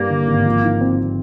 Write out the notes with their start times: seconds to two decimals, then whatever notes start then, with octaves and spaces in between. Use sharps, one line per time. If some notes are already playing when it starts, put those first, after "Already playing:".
Already playing: G2 G3 A#3
0.10 D3
0.28 G#1
0.46 F3
0.64 D#4
0.81 C4